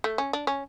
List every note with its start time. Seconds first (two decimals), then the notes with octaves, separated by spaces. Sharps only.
0.04 A3
0.18 C#4
0.33 D4
0.47 C#4